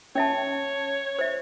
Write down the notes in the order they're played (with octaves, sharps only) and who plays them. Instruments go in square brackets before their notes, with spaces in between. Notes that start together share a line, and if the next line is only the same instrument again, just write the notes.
[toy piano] C#4 E5 A5 [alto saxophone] C#5
[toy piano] C5 E5